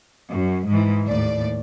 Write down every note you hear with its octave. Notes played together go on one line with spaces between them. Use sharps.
F#2
G#2 E3
D#2 A2 D5